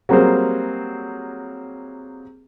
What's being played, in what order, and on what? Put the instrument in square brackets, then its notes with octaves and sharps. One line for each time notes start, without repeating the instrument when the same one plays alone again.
[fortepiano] F#3 G3 A#3 C4 G#4 C5